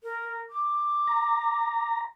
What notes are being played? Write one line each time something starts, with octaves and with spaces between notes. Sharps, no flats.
A#4
D6
A#5